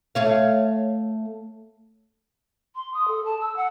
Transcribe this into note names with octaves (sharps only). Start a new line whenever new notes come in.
A3 C#5 F5
C6
D#6
A4
A5
E6
F#5